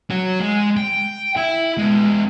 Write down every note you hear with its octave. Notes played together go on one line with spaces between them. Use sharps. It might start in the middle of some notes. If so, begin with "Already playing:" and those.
F#4 C#5
G#3
G5
E4
G#3 B3